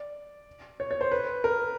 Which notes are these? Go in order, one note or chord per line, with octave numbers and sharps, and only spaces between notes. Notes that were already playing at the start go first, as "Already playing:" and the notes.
Already playing: D5
C#5
C#5
C5
B4
A#4